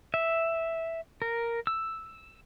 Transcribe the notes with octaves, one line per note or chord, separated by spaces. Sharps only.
E5
A#4
E6